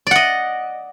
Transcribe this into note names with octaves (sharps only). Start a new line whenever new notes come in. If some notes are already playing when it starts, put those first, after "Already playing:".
D5 D#5 F#5